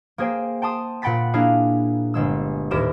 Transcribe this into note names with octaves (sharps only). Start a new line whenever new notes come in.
A#3 G#4 C5 G5
G5 A5 C6 D#6
A#2 F#5 G5 B5 A6 B6
A#3 D4 E4 G#4 F5
G1 G#3 E6
D#1 D#2 A2 G4 A#4 E7